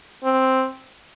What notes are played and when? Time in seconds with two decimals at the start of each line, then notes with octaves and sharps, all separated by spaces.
0.24 C4